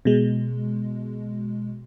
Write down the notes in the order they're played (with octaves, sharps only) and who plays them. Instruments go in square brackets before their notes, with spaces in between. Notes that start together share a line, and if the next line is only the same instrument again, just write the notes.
[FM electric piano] B2 G#3